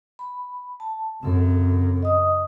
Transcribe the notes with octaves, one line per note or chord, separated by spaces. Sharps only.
B5
A5
F#2 C#3 C4 A4
D#5 D#6